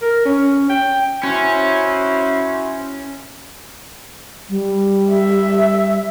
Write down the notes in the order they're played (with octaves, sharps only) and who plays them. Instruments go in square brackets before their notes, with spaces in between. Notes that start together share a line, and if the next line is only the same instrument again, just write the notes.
[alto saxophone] A#4
C#4
G5
[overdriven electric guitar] C#4 [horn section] E4 F#4 C5
[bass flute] G3
[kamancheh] E5